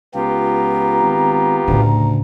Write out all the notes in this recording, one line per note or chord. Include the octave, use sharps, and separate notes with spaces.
C#2 B3 F4 G4 A#5
G#1
D2 A2 C#3